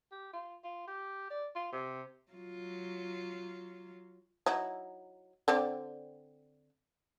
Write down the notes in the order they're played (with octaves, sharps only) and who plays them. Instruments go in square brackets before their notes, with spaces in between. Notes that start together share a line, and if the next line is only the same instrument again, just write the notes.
[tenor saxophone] G4
F4
F4
G4
D5
F4
C3
[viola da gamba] F#3 F4
[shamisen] F#3 D#4 E4
D3 C4 D5